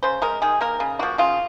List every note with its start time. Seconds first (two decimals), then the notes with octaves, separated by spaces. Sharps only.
0.03 C#3 C5
0.22 G#3 A#4
0.42 D#3 G#4
0.61 A#3 A#4
0.80 C#3
0.99 F3 A#3 F#4
1.18 C#3 F4